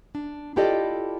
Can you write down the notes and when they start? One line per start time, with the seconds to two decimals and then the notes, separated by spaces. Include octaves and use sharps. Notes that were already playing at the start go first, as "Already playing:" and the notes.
0.15 D4
0.56 E4 F4 G4 A4 D5 D#5